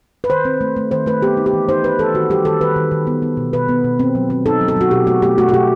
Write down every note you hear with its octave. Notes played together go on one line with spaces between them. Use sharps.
B4
D#3 C5
C4
A3
A3
D#3 C5
A3 B4
B3 G4
D#4
G4
E3
D#4 C5
D#4 B4
E3 A4
D#3 F#4
G3 G4
D#3 A4
D#3 B4
D#3
D#3
B3
B3
B2
B2 B4
B3
B2
C4
F#3
C4
D#4 A4
F#3
A4
F#3 F#4
B2 G4
A3 F#4
A3 G4
A3 F#4
F#4
B2 G4